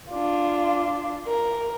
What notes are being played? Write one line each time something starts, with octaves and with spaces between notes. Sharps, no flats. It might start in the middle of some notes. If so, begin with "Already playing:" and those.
D4 F4
A#4